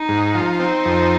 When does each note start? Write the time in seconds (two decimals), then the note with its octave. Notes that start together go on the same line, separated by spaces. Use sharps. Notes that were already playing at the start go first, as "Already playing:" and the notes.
Already playing: D#4
0.09 G#2
0.34 F3
0.60 C4 D#4
0.85 F2